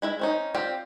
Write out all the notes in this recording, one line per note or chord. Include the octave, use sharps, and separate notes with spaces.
G#3 E4 E5
C4 C#4 D#4
C4 F4 G4 D5 G5